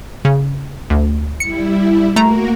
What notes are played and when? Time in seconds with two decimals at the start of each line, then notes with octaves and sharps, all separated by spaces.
0.25 C#3
0.90 D2
1.40 G3 E4 C#7
2.16 A3 A#3 F#4 A#4 A#5